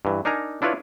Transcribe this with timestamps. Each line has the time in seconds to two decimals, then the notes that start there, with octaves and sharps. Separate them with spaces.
0.05 G2 E3
0.25 D4 D#4 A#4 G#5 A#5
0.62 D4 E4 F4 B4 C#5